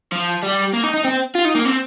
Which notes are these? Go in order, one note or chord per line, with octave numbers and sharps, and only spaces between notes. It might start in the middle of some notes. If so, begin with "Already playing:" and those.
F3
G3
A#3
D#4
D#4
C4
F4
D#4
A#3
C4